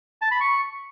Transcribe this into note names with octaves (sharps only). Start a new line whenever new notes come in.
A5
B5
C#6